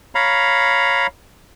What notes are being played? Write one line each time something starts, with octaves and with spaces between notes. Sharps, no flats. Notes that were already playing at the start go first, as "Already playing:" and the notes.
C#5 F5 A#5 B5